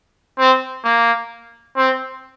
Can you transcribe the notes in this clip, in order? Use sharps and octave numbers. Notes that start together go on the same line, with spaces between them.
C4
A#3
C4